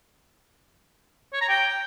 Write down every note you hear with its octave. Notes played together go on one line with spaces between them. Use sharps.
C#5
A#5
G5